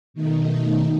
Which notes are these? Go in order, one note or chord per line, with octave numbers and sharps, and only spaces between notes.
B2 D#3 A3 D#4